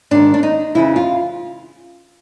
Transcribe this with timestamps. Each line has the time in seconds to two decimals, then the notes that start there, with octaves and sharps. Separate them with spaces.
0.11 G#2 D#3 D4
0.34 D4
0.43 D#4
0.75 F2 C#3 E3 E4
0.96 F4